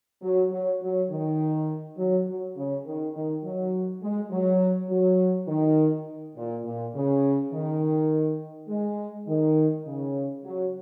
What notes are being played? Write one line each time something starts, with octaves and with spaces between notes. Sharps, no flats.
F#3
F#3
F#3
D#3
F#3
F#3
C#3
D#3
D#3
F#3
G#3
F#3
F#3
D#3
A#2
A#2
C#3
D#3
G#3
D#3
C#3
F#3